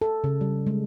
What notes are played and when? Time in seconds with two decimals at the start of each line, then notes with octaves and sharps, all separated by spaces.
0.01 A4
0.24 C#3
0.41 G3
0.67 G#3